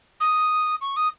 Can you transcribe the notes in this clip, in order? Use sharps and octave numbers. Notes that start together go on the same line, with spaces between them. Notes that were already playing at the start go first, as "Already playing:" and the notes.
D#6
C#6
D#6